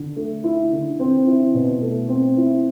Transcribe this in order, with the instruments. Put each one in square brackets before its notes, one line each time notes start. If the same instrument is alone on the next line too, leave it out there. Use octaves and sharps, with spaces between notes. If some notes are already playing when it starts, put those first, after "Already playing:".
Already playing: [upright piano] D3
A3
E4
D3
C4
E4
B2
A3
C4
E4